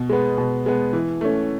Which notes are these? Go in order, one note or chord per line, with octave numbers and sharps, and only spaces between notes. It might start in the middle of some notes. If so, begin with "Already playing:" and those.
Already playing: B2
G#3 B3
B2
G#3 B3
E3
A3 C#4